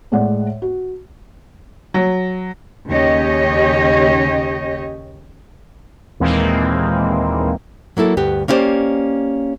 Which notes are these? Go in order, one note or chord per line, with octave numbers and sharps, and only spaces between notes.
A2 G#3 D5 F#5
F#4
F#3
D#2 C#3 C#4 G4 C#5 D#5
D#2 A#2 E3 G#3 A#3 C4
F#3 A#3 E4 A4
D2 G2 B3 G4
A#3 C#4 E4 G4 C5 D5